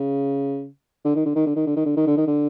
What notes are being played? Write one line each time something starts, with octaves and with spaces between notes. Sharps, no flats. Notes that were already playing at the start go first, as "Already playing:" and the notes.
Already playing: C#3
D3
D#3
D3
D#3
D3
D#3
D3
D#3
D3
D#3
D3
D#3
D3